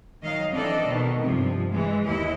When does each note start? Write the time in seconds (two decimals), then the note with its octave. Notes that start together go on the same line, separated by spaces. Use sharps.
0.22 D#3 F#3 D#5 F5
0.52 E3 C4 D4 A4 D5 D#5
0.85 B2 D#3
1.22 G2 C3 F3
1.71 E3 G#3
2.04 D#2 E4 D#5